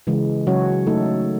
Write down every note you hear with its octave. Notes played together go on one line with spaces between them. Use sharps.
C#3 E3 G#3
C#3 F#3 C#4 F#4 C#5
A3 D#4 A4